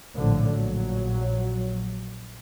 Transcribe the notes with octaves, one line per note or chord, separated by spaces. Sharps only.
A#1 A2 D3 F3
A#1 F#3